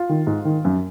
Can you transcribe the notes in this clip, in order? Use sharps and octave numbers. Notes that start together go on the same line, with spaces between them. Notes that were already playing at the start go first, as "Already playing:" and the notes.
Already playing: F4
D#3
G#2
D#3
F#2